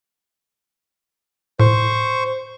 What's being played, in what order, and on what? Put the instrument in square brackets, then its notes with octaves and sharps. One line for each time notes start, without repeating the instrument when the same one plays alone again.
[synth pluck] A2 [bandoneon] C5 C#6